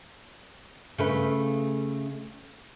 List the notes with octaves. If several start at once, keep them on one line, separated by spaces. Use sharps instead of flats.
C#3 A3 B4